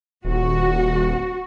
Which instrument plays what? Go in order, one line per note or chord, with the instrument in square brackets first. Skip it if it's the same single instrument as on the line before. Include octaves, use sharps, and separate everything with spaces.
[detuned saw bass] D#1 [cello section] F#4